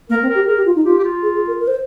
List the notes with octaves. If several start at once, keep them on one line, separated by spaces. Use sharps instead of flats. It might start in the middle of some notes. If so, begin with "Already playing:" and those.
A#3 A#4
C4
A#4
G4
G#4 A#4
G4
F4
D#4
F4 G4
G4
F4
G#4
G#4
A#4
A#4
C5